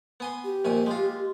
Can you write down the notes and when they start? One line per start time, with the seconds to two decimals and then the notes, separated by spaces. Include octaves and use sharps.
0.20 B3 G#5 C6
0.44 G4
0.65 A#1 D#2 G#5
0.86 G#3 F4